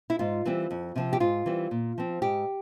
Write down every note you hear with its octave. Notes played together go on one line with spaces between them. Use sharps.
E4
G#2 F4
E3 G3 C4
F2
C3 F3 C4
G4
G#2 F4
E3 G3 C4
A#2
F3 C4
G#2 G4